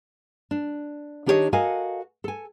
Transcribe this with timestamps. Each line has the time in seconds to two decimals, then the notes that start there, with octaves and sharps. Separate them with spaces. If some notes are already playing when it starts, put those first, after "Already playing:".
0.51 D4
1.26 D#3 D4 G4 G#4 C#5 D#5
1.53 F#4 A4 A#4 D#5 F5 G#5
2.24 A4 G#5